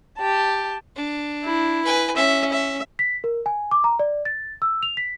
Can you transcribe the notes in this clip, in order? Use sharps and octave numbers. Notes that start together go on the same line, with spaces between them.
G4 A5
D4
E4
B4 G#5
C#4 E5
E5
B6
A#4
G#5
D6
A#5
D5
A6
E6
F7
B6